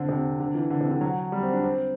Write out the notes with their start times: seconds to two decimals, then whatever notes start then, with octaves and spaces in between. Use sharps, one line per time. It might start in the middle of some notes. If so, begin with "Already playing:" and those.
Already playing: D3 C4
0.09 C3
0.40 D3
0.55 E3
0.70 D3
0.81 C3
0.91 D3
1.01 F#3
1.32 G3
1.43 C4
1.53 D4
1.64 C4